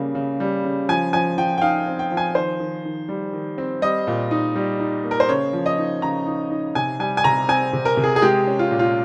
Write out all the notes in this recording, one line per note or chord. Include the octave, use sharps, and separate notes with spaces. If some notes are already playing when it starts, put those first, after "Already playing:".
Already playing: C#3 G3 A#3
C#3
G3
C#3
F3 G#5
F3 G#5
F3 G5
G5
D#4 F5
C4
G5
F3
G#5
D#3 C5
D#3
D#3
G3
D#3
C4
G3 D#5
A#2
D#4
G3
D#4
A#3
A#4
C5
C#3 C#5
F3
D#5
D#4
C#3 A#5
D#4
D#4
C3 G#5
G3 G#5
G#5
C3 A#5
C4 G#5
C3
A#4
C3
G#4
G#4
G#3 G4
C#4
F4
A#2
F4